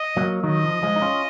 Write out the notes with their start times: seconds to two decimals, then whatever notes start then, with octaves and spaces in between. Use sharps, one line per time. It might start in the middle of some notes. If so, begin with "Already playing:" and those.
Already playing: D#5
0.17 F#3 A#3
0.43 D#3 F#3 D#5
0.63 F3
0.82 F3 G#3
0.96 D#4
1.02 C#4 F4